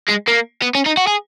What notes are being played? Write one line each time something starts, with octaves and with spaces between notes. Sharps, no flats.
G#3
A#3
B3
C#4
D#4
F#4
G#4